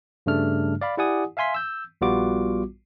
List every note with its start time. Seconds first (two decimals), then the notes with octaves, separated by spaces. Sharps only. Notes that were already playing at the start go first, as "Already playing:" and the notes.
0.26 G2 C#3 G3 A3 D4 F6
0.81 D5 F5 B5
0.97 E4 G4 D5 F#5 G#5 D#6
1.37 E5 F5 G#5 C6 B6
1.54 E6 G6
2.01 A#1 G3 B3 F4 F#4 D6